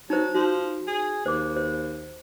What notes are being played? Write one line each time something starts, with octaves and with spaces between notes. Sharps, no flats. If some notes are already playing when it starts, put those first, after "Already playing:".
F#3 D#4 C5
F3 F#4
G#4
D#2 C5 D6
C5